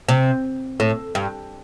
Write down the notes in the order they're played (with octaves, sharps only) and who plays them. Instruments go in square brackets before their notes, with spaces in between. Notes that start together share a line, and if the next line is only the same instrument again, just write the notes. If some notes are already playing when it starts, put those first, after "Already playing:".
[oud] C3
A2
G2